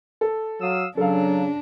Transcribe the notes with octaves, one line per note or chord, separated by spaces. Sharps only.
A4
F#3 F5 D#6 E6
C#3 F#3 D4 A4 F5